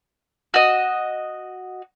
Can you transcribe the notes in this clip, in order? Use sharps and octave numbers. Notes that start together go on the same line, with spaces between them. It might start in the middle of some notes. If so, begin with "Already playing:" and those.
F#4 D#5